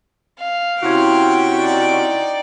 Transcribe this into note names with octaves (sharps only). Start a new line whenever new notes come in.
F5
C3 C#4 E4 F#4 G5 C6 G#6
D#4 D5